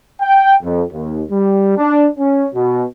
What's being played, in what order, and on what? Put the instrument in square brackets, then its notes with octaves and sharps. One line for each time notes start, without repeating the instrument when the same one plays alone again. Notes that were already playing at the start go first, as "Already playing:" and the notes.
[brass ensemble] G5
F2
D#2
G3
D4
C#4
B2